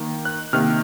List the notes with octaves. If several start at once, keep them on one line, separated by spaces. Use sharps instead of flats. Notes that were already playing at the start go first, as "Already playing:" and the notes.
Already playing: D#3 A#3
F#6
C3 D#3 A#3 F6